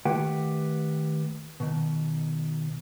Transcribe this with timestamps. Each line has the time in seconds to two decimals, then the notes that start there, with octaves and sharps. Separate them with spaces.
0.05 D#3 A3 G4 B4 F#5 G5
1.60 B2 D#3